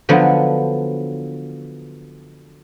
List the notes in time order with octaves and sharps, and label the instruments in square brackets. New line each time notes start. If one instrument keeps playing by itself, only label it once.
[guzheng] D3 F3 F#3 B3